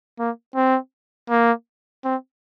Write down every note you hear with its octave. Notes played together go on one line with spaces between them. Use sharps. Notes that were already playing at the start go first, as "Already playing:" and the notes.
A#3
C4
A#3
C4